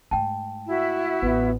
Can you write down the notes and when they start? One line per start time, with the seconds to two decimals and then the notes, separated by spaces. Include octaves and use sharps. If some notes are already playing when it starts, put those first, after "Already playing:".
0.11 G#2 A3 G5 A5
0.67 E4 F#4 E5
1.22 A1 B3